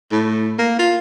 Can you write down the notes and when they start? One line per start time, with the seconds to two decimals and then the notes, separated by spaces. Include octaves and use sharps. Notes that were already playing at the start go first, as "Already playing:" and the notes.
0.11 A2
0.59 A#3
0.79 F4